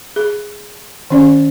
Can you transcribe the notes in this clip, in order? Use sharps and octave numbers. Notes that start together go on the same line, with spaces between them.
G#4
D#3 C#4 D5